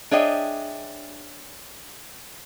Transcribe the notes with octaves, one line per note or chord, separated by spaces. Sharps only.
D4 G#4 C#5 D#5 E5 G5